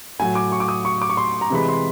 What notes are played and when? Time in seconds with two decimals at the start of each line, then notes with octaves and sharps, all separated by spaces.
0.19 A2 F#3 G#5
0.35 D6
0.52 C#6
0.60 D6
0.68 D#6
0.85 C#6
1.02 D6
1.09 C#6
1.17 C6
1.41 A#5
1.50 C3 E3 G#3 B5
1.69 C6